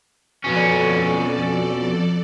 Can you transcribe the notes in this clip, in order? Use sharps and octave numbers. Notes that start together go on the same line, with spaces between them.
F2 B2 C#4 A4 D5